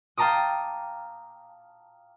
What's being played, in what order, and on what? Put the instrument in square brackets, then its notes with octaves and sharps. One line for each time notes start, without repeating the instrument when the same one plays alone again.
[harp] F5 G5 A5 A#5 D6 D#6